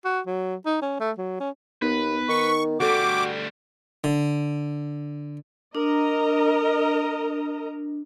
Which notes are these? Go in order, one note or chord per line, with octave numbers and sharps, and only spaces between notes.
F#4
F#3
D#4
C#4
A3
F#3
C#4
D#2 B3 D#4 B4
D#3 C#6
D2 G3 F#4 A4 C#6 D6
D3
D4 A#4 D#5 A#5